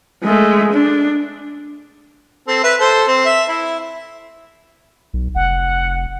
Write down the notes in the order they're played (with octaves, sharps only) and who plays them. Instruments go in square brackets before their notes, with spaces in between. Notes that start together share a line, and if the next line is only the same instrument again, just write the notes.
[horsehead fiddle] G#3 A3
D4
[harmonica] C4 A4
B4 E5
A4 C5
C4
E5
E4
[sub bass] B1
[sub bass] F1 [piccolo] F#5